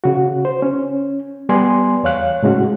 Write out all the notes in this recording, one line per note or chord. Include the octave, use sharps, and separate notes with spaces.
C#3 F#4
C5
C#4
G3 B3 D5 G#5 C6
E2 C#5 F5 F#6
A2 C#3 G#3 C#4 F#4